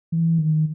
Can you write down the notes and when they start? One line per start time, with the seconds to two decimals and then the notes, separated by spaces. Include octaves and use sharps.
0.12 E3
0.38 D#3